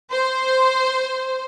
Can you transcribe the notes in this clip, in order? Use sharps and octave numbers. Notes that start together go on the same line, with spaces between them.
C5